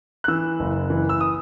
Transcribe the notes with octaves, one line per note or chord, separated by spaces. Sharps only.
F#6
E3 E6
F#1
E3
E6
D#6